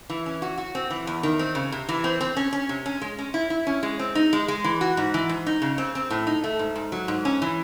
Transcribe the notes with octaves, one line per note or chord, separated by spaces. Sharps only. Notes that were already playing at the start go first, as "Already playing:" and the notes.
E3
C#4
F#4
F#4
C4
E3
E2
D#3
C4
C#3
C3
E3
C4
C4
C#4
C#4
C3
C#4
G#3
C#4
E4
E4
C#4
G#3
C4
D#4
G#3
G#3
E3
F#4
G#2
E3
G#2
D#4
C#3
C4
C4
A2
D#4
A3
G#2
G#2
F#3
G#2
C#4
E3